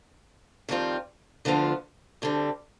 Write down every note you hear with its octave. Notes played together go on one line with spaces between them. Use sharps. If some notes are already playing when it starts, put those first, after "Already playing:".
F2 D#3 G3 C4 F4
D2 D3 F3 B3 F4
D2 D3 G3 C4